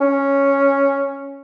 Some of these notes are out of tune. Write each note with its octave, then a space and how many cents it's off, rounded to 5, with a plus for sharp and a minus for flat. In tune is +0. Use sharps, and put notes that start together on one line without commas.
C#4 +0